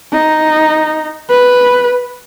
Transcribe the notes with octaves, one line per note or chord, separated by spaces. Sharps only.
D#4
B4